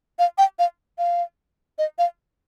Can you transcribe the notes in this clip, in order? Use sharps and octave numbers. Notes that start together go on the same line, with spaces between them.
F5
G5
F5
F5
D#5
F5